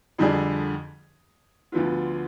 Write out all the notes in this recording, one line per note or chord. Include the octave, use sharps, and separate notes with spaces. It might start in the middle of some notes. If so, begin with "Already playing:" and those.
F2 D3 G3 D4 G#4
D2 D3 F3 B3 F4